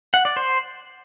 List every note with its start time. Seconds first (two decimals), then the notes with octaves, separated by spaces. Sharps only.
0.14 F#5
0.25 D5
0.37 C5